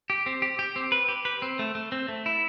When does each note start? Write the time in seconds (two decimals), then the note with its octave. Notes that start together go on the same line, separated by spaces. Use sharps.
0.10 G4
0.26 C4
0.42 G4
0.59 G4
0.76 C4
0.92 B4
1.09 G4
1.25 B4
1.42 C4
1.59 A3
1.75 A3
1.92 C4
2.09 A3
2.26 E4